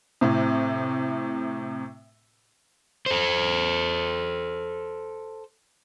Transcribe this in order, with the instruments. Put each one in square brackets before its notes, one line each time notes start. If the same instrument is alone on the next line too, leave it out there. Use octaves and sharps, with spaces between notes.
[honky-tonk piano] A2 C3
[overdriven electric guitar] A4 C5